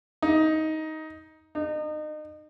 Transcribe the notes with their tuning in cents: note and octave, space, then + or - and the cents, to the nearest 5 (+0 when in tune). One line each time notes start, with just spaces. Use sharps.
D#4 +15
D#4 -30